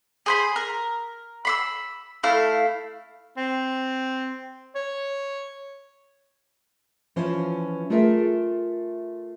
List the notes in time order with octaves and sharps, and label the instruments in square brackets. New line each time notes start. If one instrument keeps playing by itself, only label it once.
[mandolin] G#4 C5 B5
A#4
B5 C6 E6
A3 E4 F5
[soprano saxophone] C4
C#5
[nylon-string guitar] E3 F3 C#4 F4 C5
A3 F4 G#4 A#4 E5